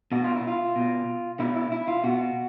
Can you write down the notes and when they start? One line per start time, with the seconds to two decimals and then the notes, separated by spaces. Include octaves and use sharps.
0.12 B2 F#4
0.24 F4
0.36 E4
0.48 F4
0.76 B2
1.40 B2 E4
1.56 E4
1.72 E4
1.88 F4
2.04 B2 F#4